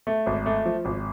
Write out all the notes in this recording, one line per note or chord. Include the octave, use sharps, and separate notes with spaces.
A3
G#1
A3
F3
G#1